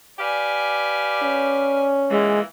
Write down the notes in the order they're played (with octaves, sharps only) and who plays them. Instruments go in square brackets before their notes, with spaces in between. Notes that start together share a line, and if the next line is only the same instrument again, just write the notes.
[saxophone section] G4 B4 F5 [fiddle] D5 G#5
[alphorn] C#4
[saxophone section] A#2 E3 [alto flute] G#3